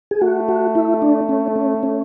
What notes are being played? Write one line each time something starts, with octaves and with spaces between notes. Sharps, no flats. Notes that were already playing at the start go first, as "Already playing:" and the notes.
G#4
A3 F#4
F#4
E4
D4
C#4
C#4
C#4